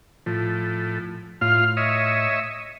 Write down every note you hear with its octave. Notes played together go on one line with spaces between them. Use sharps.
A2 F3
A2 F4 F5
C#5 D#5 E5